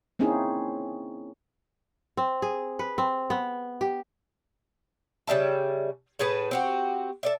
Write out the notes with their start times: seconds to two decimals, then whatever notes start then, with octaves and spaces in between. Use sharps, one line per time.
0.19 A#3 C4 C#4 D#4 E4 G#4
2.17 C4
2.42 G#4
2.79 B4
2.98 C4
3.30 B3
3.81 G4
5.27 C#3 G3 E5 A5
6.19 A2 G#4 B4 A5
6.51 C4 F#4 G4
7.23 A4 D5 E5